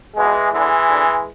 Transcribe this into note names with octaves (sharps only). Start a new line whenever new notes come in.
C#2 B2 E3 G#3
E2 D3 E3 G#3
D2 D3